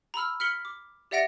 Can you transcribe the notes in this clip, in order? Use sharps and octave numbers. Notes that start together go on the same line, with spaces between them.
A#5 B5 E6 F6
F6 B6 C#7 F#7 G7
D6
G4 D5 E5 F#5 A#6 D7